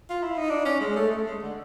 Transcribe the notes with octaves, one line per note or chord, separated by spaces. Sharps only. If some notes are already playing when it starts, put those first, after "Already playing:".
F4
E4
D#4
D4
C#4
G#3
A3
A3
G#3
D3